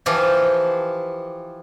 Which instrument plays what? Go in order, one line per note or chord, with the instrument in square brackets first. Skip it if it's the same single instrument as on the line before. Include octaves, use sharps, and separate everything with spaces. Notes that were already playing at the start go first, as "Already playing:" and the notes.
[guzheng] E3 F3 F4 G4